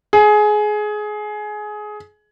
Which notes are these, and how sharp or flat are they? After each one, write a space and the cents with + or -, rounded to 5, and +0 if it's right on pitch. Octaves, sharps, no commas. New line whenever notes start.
G#4 +20